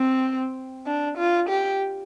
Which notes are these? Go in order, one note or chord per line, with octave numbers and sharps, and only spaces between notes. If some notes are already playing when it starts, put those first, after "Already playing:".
Already playing: C4
D4
F4
G4